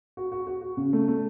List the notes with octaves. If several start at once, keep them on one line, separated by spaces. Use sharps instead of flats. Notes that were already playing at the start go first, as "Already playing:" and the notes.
F#4
F#4
F#4
F#4
C#3
A3
A3